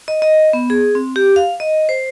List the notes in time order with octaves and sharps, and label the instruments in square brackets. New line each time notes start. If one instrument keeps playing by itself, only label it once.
[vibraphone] D#5
D#5
B3
G#4
C4
G4
F5
D#5
C5